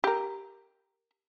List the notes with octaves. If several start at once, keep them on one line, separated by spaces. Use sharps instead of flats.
G4 A#4